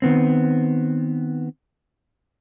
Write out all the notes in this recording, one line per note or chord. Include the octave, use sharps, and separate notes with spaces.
D#3 B3 C4